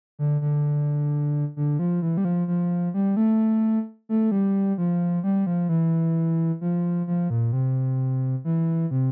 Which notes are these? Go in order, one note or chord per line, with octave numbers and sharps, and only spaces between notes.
D3
D3
D3
F3
E3
G3
F3
F3
G3
A3
A3
G3
F3
G3
F3
E3
F3
F3
A#2
C3
E3
C3